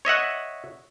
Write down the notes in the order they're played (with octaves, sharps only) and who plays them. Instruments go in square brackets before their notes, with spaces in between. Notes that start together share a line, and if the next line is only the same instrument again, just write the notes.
[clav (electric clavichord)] C#5 D#5 E5 F#5